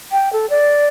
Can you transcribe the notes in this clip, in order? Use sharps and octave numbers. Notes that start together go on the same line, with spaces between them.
G5
A4
D5